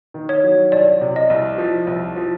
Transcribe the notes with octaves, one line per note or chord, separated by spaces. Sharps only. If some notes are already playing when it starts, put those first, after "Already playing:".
D#3
C#5
F#3
C2 D5
C3
D#5
C2
F3
C2
F3